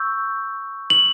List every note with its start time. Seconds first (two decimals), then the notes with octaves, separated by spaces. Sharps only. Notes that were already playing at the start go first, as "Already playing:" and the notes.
Already playing: C#6 E6 G6
0.90 F#7